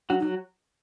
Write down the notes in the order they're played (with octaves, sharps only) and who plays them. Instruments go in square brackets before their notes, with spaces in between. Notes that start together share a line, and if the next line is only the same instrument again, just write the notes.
[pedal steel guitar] F#3 F#4 [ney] D4
[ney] D#4
[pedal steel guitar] F#3 F#4